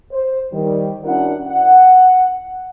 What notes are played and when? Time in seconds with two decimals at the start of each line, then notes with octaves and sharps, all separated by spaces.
0.11 C5
0.53 D#3 G3
1.04 C#4 D4 E4 F#4 A#4 F#5
1.47 F#5